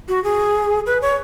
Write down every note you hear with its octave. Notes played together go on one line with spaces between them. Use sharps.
F#4
G#4
B4
C#5